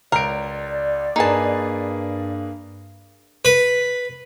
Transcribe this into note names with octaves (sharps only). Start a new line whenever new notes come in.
C#2 A#4 D5 D7
G2 A#3 D#4 G#4 B4 A5
B4